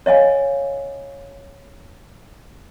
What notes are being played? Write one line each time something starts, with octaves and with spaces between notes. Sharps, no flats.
C#5 D#5 F5 G#5